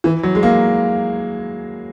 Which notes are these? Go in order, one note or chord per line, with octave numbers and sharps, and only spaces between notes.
E3
F#3
G#3
A#3